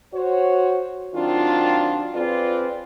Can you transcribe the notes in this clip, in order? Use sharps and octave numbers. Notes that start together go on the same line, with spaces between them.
F#4 C5 C#5
D#3 F#3 C4 D4 F4
F3 C4 F4 G#4 B4 D5